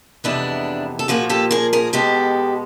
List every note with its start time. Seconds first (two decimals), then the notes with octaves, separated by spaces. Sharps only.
0.24 F2 C3 E3 G#3 B3 D4 E4
0.99 A4
1.08 A#2 F3 A#3 F#4 G#4
1.29 G4 A4
1.51 G#4 A#4
1.73 G#4 A#4
1.93 B2 G#3 B3 G4 A4